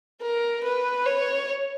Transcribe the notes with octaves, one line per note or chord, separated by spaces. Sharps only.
A#4
B4
C#5